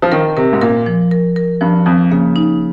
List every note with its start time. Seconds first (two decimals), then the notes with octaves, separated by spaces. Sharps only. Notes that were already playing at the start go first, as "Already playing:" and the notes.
0.02 F3
0.12 D#3 A#4
0.37 C3 A#4
0.53 G#2
0.61 A#2 A#4
0.86 F3
1.11 A#4
1.36 A#4
1.61 G2 F3
1.86 F2 F3
2.11 C#3 A#3
2.36 D#4